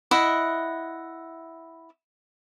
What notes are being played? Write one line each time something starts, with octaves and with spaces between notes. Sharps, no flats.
E4 D#5 F#5